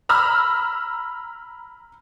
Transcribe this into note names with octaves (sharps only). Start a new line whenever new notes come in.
A#5 B5 E6 F6